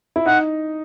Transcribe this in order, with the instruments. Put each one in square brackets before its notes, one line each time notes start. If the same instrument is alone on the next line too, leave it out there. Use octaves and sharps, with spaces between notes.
[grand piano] E4
[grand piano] D#4 [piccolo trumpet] F#5